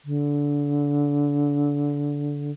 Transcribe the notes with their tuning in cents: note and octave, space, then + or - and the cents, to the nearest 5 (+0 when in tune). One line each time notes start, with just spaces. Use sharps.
D3 -20